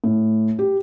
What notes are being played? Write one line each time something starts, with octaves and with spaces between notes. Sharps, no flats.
A2
G4